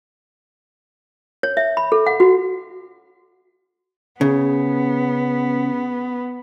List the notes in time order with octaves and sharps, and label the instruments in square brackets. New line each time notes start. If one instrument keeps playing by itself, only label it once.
[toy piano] C#5
E5
B5
A4
F#5
F#4
[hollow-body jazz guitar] C#3 [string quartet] B3